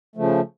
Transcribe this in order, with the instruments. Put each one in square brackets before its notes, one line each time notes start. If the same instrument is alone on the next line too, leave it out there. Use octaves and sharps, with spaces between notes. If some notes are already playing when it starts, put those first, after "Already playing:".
[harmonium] C#3 F3 A3